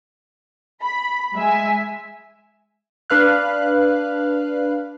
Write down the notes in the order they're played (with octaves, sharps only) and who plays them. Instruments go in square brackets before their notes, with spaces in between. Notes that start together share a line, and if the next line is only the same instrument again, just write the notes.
[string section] B5
G#3 E5 G#5
[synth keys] D4 B4 F5 F#6